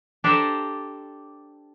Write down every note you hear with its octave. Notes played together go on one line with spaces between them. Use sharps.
D4 G4 A4 C5 E5 A#5